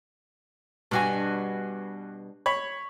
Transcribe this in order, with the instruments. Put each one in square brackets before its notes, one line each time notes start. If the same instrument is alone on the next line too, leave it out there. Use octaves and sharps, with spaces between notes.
[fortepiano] G2 F#4 G#5 [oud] B2 G3 D4
[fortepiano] C#5 B5